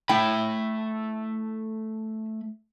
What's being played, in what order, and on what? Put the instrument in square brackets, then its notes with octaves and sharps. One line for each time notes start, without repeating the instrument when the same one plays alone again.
[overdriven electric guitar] A3 B5 [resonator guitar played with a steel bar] E4 G5